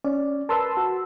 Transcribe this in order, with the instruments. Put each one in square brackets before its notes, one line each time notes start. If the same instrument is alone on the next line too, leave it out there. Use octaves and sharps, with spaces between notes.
[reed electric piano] C#4 [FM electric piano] D5
[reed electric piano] A#4 B4 [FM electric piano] A5 C6 E6
[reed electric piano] F#4